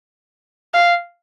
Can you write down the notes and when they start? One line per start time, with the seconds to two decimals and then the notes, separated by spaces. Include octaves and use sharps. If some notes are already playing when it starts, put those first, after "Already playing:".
0.74 F5